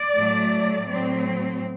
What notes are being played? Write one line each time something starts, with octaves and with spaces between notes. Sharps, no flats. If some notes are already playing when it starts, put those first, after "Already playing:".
Already playing: D5
A2 F#3 A3
A2 F#3 C4